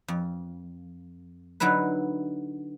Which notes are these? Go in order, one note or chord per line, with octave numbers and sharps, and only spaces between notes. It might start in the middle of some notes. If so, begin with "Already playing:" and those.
F2
D3 F#3 D#4 E4 B4